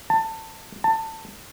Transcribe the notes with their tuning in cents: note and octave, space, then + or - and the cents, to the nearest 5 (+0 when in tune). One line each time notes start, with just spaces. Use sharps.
A5 +25
A5 +25